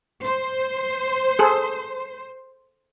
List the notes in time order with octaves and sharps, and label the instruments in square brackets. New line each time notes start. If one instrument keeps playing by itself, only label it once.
[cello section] C5
[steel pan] G#4 A4